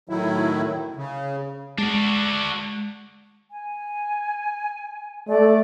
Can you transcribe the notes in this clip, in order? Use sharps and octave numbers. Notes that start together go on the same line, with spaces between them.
A2 D#3 F#3 E4
C#3
G#3 D4 F#4
G#5
A3 D5